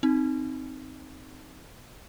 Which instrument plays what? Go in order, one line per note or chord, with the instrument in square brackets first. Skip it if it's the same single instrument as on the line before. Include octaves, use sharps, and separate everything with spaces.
[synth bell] C4 D#4